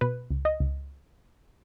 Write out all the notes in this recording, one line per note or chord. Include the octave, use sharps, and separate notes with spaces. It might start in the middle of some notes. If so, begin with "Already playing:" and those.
B2 B4
C#2
D#5
C#2